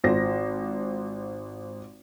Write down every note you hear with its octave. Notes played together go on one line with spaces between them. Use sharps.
G#1 F4 C5 A#6